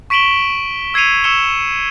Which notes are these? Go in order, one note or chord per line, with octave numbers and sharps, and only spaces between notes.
C#6 B6 D7 E7 F#7 G7
E6 G#6 C7 C#7 D#7 F7
C#6 E6 C#7 E7 G7